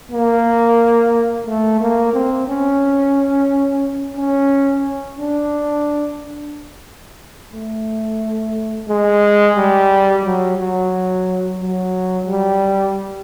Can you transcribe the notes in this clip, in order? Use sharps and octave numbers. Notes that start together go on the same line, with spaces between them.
A#3
A3
A#3
C4
C#4
C#4
D4
A3
G#3
G3
F#3
F#3
F#3
G3